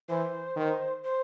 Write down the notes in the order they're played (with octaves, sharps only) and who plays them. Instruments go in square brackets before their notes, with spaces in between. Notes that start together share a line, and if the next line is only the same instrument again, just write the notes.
[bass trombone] E3 [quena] C5
[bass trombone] D#3
[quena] C5